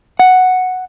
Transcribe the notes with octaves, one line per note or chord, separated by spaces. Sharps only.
F#5